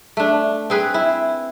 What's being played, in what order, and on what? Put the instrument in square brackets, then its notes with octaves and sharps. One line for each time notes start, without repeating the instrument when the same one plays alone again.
[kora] A3 D4
C4 G#4 B4
E4